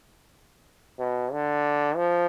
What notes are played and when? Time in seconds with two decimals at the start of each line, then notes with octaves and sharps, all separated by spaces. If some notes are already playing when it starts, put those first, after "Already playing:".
0.99 B2
1.32 D3
1.96 F3